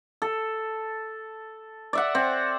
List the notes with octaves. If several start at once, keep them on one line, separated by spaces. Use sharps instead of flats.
A4
D5 E5 F#5
C4